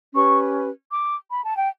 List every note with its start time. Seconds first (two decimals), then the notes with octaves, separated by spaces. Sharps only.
0.14 C#4 G4 B4 C#6
0.92 D6
1.31 B5
1.44 A5
1.56 G5